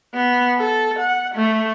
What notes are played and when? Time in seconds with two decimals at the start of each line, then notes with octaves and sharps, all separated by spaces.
0.14 B3
0.58 A4
0.99 F#5
1.35 A3